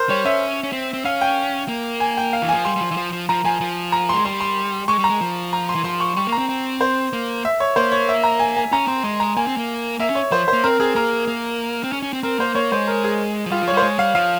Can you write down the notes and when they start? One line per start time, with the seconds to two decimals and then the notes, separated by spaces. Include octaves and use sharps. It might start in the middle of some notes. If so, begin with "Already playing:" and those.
Already playing: A#4 C5
0.09 G3 C#5
0.25 C#4 E5
0.63 C#4
0.73 C4
0.93 C4
1.05 C#4 F5
1.21 G5
1.68 A#3
2.00 G#5
2.17 G5
2.33 F5
2.42 E3
2.49 G#5
2.54 F3
2.65 G3 C6
2.76 G3
2.81 F3
2.91 E3
2.97 F3
3.12 F3
3.29 F3 A#5
3.44 F3 G#5
3.61 F3
3.92 A#5
4.09 G#3 C6
4.25 G3 C6
4.41 C6
4.88 G#3 C#6
4.99 G3
5.04 A#5
5.10 G#3
5.21 F3
5.53 A#5
5.69 C6
5.75 E3
5.84 F3 C6
6.00 C#6
6.16 G3 C#6
6.27 A#3
6.32 A#5
6.38 C4
6.49 C4
6.81 C5
7.13 A#3
7.45 E5
7.60 C#5
7.76 A#3 C5
7.92 C#5
8.09 E5
8.24 A#5
8.40 G#5
8.56 G#5
8.72 C#4 A#5
8.88 C4 C6
9.04 G#3 C6
9.20 A#5
9.37 A#3 G#5
9.47 C4
9.57 A#3
9.99 A#3 E5
10.10 C#4
10.15 C#5
10.31 F3 C5
10.48 C5
10.53 A#3
10.64 C4 A#4
10.80 C4 G#4
10.95 A#3 A#4
11.27 A#3
11.84 C4
11.92 C#4
12.02 C#4
12.13 C4
12.23 C4 A#4
12.39 A#3 C5
12.55 A#3 C#5
12.72 G#3 C5
12.87 A#4
13.04 G#4
13.46 F3
13.51 G3 F4
13.63 F3
13.68 C#5
13.73 G3 C5
13.83 G#3 C#5
13.99 G3 F5
14.15 F3 F5